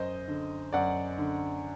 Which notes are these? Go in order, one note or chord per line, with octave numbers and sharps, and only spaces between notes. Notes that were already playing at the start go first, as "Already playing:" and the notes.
Already playing: F#2 C5 D#5
D3
F#2 D5 F#5
D3